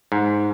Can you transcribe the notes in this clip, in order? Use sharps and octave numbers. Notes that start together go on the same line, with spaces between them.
G#2